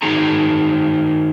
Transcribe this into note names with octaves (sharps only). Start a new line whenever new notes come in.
D#3 D#4 F#4 G#4 A#5